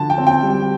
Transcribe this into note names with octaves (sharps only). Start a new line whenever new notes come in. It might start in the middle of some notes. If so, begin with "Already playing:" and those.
Already playing: D3 F3 A5
G5
C4
G5
G3